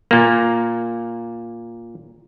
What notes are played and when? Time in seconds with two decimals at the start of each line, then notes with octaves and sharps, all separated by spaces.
0.11 A#2 A#3